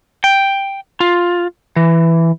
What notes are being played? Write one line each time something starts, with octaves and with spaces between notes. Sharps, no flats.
G5
F4
E3